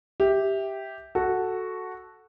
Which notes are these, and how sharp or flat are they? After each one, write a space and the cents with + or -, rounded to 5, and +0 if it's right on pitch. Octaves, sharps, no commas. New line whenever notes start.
G4 +0 E5 -10
F#4 +0 A4 +0